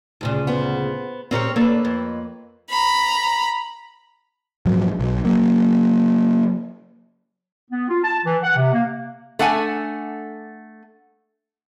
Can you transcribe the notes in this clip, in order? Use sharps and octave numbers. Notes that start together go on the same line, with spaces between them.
D2 A#2 C#3
B3 C5
A#2 C4 C#4 G4 A#4 C#5
A#3 D4 A4 B4 C#5
F2
A#5 B5
A#1 G#2 F3 F#3
B1
F#3 A#3
B3
F4
A5
E3
F#5
C3
A#3
A3 D4 F#5 G#5